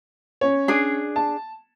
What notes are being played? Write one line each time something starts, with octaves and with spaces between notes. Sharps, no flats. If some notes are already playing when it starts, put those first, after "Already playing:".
C#4 C#5
D4 G#4
A5